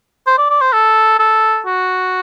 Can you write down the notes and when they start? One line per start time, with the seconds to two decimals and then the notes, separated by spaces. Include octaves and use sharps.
0.27 C5
0.38 D5
0.50 D5
0.61 C5
0.73 A4
1.19 A4
1.66 F#4